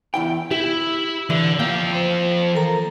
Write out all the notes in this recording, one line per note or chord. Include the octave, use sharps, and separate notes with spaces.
E2 E4 G5
E4 G4
D3 E3
F3 A#3 G5
C5
A4 A#4 A#5